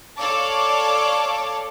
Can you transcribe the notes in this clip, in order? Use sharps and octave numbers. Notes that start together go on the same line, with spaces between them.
A4 C#5 D5 F5 A5 D6